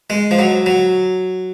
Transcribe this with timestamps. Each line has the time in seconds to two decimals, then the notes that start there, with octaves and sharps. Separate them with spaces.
0.10 G#3
0.31 F3
0.39 F#3
0.66 F#3